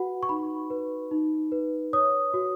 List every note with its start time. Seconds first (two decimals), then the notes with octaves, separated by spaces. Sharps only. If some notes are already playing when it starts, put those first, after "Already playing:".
Already playing: F#4 B4 F#5 B5
0.23 C#6
0.29 D#4 B5
0.70 B4
1.11 D#4
1.52 B4
1.93 C#5 D#6
2.34 F#4